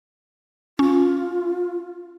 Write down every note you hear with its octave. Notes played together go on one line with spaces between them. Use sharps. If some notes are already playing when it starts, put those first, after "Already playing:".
C#4 F4